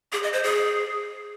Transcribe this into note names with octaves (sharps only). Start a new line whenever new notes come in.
G#4
D#5
C5
G#4